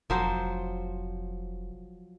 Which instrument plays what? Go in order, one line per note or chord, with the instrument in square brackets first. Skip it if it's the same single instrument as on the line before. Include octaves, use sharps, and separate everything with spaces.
[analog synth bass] F1 [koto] F3 F#3 C5